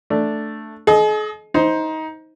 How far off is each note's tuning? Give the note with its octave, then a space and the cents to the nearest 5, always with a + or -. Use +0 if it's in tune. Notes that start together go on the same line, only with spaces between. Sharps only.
A3 +0 D4 +0
G#4 +45 D#5 +0
D#4 +20 C5 +0